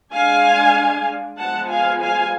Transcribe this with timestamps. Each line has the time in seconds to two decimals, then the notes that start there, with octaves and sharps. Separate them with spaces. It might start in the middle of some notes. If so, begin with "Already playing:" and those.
0.12 G#3 D4 F5 G#5
1.37 F3 G#3 B3 F#5 A5
1.69 F5 G#5
2.01 F5 G#5